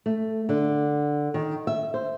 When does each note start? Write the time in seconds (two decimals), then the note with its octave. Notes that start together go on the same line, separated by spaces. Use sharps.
0.06 A3
0.49 D3
1.34 D#3
1.67 E5
1.94 C5